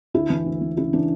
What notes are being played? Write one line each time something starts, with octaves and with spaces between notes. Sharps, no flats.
D2 E4
E3
D2
E3
C#3 E4
E3 D4